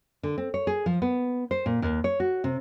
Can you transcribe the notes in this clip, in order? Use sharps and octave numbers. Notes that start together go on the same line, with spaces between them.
D3
C4
C#5
G#4
F3
B3
C5
A#2
D#2
C#5
F#4
C3